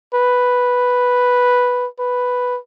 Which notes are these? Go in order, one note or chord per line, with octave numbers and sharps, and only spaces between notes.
B4
B4